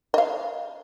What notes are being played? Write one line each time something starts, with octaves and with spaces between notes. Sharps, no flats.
D#5 F5